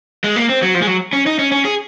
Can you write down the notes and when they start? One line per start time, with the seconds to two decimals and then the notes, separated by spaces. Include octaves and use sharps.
0.24 G#3
0.36 A#3
0.49 C4
0.62 F#3
0.75 F3
0.82 G#3
0.87 F#3
1.13 C#4
1.26 D#4
1.39 C#4
1.52 C#4
1.65 G#4